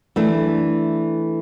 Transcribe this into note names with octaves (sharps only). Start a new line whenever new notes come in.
E3 A3 D4